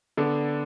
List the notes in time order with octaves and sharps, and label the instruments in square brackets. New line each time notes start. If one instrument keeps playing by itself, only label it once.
[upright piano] D3 B3 D4 A4